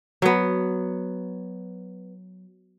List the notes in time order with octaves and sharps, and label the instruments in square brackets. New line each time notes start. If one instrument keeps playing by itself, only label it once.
[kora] F#3 B3